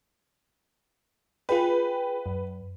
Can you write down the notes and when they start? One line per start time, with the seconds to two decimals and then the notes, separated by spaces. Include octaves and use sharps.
1.49 F4 G#4 B4 G5
2.26 F#2